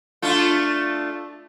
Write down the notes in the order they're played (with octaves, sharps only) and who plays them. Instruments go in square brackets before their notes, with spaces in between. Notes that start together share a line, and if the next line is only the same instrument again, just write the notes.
[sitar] A3 D4 F4